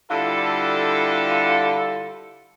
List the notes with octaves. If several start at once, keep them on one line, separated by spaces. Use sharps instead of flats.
D3 G3 E4 F4 A4